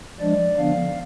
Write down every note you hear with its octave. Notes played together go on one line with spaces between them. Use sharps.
F3 G#3 D4 D5
D3 F3 B3 D4 F5